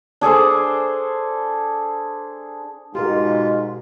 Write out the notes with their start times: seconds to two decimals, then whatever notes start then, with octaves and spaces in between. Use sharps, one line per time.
0.21 D4 G#4 A4 C5
2.95 G#2 B2 F4 G4 G#4 A#4